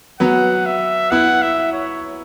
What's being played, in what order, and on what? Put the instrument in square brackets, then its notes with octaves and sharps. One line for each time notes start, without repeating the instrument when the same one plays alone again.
[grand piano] F#3 B3 [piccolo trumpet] F#5
[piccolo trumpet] E5
[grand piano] B3 E4 [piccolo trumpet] F#5
[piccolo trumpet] E5
C#5